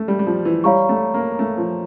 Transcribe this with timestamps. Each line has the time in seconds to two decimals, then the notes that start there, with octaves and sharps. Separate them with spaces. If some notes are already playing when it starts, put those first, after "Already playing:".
Already playing: A3
0.08 G3
0.19 G3
0.27 F3
0.45 E3
0.64 G3 C#5 F5 A#5 C#6
0.89 A3
1.14 A#3
1.39 A3
1.58 F3